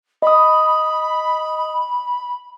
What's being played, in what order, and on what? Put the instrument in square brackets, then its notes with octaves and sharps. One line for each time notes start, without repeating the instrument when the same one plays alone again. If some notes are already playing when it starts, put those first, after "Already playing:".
[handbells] D#5 D#6 [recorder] B5